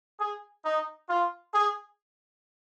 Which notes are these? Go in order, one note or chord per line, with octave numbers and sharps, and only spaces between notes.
G#4
D#4
F4
G#4